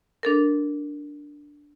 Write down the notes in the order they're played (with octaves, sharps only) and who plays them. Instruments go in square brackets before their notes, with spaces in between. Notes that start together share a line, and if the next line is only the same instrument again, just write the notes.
[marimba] D4 A4 A#4